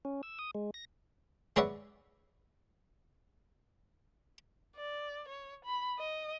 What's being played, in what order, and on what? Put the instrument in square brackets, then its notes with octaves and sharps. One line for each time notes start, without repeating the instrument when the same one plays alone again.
[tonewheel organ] C#4
E6
D#6
G#3
A#6
[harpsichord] G#3 B4 C#5 D5 E5 F#5
[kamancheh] D5
C#5
B5
D#5